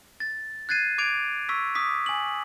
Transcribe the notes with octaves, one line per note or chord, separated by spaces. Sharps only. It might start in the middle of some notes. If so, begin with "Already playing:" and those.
A6
F#6 G#6 A6 C7 D#7
D6 G#6 D7 F7
C#6 E6 B6
D6 D#6 B6
G#5 F#7